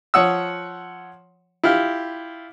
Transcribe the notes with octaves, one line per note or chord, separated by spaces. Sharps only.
F3 C#5 F#5 D#6 E6
E4 F4 G4 F6